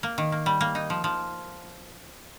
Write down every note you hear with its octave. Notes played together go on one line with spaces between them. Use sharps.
A#3
D#3
A#3
G3
A#3
D#4
F3
F3